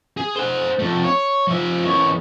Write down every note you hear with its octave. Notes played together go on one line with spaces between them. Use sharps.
G#4
C5 F#5
F2 A3
C#5
F3 E5
E2 C#5